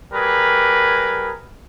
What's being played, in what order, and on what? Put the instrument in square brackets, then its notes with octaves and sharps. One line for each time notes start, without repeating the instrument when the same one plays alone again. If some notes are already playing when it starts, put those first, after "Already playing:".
[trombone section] G3 G#4 A#4 B4